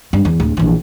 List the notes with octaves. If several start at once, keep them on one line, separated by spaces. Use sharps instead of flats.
G2
E2
D1
A#1 E3